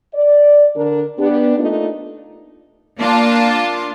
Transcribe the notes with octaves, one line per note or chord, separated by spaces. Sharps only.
D5
D3 D4 A#4
B3 D4 G4
A3 A#3 D4 D#4 F4
A#3 D4 F4 A5